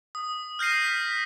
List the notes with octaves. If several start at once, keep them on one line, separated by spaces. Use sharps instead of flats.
D#6
F6 G6 A#6 C7 D#7
B6